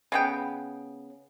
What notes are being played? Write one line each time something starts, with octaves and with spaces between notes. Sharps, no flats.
C#3 B3 G5